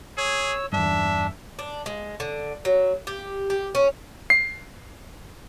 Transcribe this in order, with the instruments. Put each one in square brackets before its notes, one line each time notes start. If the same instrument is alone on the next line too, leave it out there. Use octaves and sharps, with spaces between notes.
[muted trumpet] G#4 [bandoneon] C#5 E6
[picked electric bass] E2 G2 [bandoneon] D4 [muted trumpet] E5
[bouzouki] D4
G#3
D3
F#3
G4
G4
C#4
[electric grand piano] C7